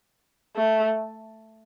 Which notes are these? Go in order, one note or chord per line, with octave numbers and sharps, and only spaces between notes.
A3